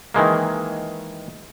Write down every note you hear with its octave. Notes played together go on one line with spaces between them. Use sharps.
D#3 E3 G#3 A#3